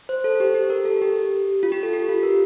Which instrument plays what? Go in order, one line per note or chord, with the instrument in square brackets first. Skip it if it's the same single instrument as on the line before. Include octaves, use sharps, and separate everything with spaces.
[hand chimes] C5
A4
G4
G4
A#4
A4
G4
F4
G4
A4
G4
F4
A#4